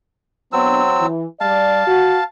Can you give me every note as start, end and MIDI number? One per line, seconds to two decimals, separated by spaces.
0.53 1.06 54
0.53 0.82 59
0.53 1.06 60
0.53 0.82 62
0.53 1.06 88
0.98 1.25 52
1.40 1.82 55
1.40 1.82 74
1.40 2.24 77
1.40 2.24 81
1.87 2.18 66